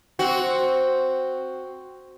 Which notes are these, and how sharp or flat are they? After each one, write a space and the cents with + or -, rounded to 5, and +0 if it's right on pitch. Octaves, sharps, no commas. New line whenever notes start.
C4 +0 F#4 +0